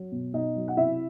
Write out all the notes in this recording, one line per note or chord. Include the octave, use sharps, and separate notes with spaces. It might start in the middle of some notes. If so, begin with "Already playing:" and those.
Already playing: F#3
B2
B2 D#4 D#5
F#3
F#5
C3 E4 E5